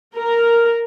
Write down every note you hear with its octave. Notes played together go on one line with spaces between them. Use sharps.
A#4